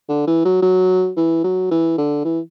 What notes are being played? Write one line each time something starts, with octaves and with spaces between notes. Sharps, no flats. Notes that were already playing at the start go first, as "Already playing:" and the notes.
D3
E3
F#3
F#3
E3
F#3
E3
D3
E3